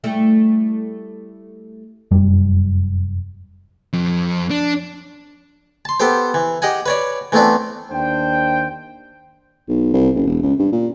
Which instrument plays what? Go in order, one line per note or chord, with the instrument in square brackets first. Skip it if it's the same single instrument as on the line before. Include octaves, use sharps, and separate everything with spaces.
[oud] G3 A3 E4
[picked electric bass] F1 F#2 G3
[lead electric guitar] F2
D4
[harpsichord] A5 C6
B3 G4 A4 C5
E3
G4 D#5 F#5 G#5
B4 C#5 D5
E3 A3 B3 C4 D4
[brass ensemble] D#2 D4 C5 G5
[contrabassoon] B1
C2
F#1
E1
C#2
G2
A#2